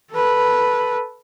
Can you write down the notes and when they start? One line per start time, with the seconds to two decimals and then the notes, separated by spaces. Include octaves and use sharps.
0.12 A4 B4